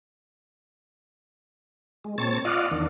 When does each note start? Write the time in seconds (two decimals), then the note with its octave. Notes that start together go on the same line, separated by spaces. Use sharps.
2.04 G#3
2.18 A#2 C4 C#5 A5 A6
2.45 F4 D5 D#5 F5 F#5
2.71 E2 D#3 D4